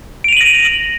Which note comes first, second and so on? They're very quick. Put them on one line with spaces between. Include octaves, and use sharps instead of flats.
D7 F7 D#7 F#7 A#6